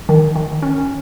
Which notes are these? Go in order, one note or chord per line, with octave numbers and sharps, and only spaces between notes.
D#3
D#3
C#4